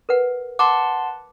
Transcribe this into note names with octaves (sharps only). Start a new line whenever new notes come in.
A#4 B4 F#5
F#5 A5 C6 D6